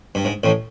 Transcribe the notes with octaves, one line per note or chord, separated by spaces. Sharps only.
G2
G#2
A1 A2